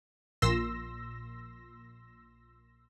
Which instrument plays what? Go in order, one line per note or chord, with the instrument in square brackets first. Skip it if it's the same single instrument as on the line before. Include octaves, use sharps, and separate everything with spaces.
[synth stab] A#1 A#2 C6 E6 A#6